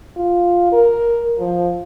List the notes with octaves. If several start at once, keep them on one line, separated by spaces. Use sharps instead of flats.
F4
A#4
F3